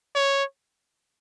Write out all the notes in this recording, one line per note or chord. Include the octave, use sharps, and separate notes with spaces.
C#5